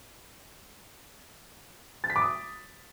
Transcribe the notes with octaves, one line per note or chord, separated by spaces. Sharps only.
A6
B6
D6
D#6